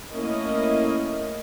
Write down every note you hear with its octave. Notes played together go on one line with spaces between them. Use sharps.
A3 A#3 C#4 E4 A#4 D#5